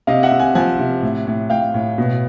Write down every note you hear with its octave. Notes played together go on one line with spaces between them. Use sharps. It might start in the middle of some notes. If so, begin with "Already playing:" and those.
C3 D#5 F5
E5 F#5
C3
F#5 G#5
F3 F#5 G#5
C3
A2
A2
A2 F5 G5
A2
B2